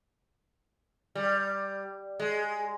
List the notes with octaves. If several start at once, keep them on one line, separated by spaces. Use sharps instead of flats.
G3
G#3